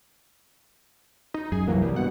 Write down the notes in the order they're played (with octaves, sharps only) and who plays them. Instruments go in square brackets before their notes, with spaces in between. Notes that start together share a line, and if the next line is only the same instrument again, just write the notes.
[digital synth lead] D#4
[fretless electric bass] F#2 [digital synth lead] G#4
[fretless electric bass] C2 E3 A#3 [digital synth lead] F#3
[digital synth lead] G3
[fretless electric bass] G2 B2 [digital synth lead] F#5